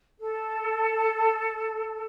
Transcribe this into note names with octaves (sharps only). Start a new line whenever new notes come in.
A4